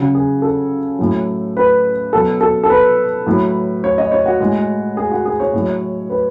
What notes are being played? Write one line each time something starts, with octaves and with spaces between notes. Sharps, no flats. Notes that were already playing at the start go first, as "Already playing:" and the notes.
Already playing: C#3 F#3 F#4
G#4
A4
A2 F#3
B4
B2 F#3 A4
A4
A4
B4
A2 F#3
C#5
D#5
C#5
F#4
A2 G#3
G#4
F#4
G#4
C#5
A2 F#3
B4